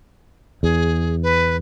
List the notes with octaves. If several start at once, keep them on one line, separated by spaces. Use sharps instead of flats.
E2 G#4
B4